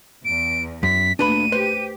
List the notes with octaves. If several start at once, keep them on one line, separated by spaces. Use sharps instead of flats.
E2 D7
F#2 B6
D2 A#2 D4 B4 B5 D#7
G4 B4 C5